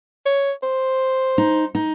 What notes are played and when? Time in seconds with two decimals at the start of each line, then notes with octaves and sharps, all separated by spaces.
0.26 C#5
0.63 C5
1.38 D#4
1.75 D#4